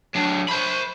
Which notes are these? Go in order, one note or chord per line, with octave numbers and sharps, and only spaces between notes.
F#3 D4
C5 B5